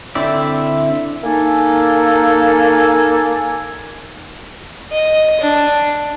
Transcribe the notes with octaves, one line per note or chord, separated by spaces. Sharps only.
D3 C4 E4 D5 E5
A#3 D#4 A4 G#5
D#5
D4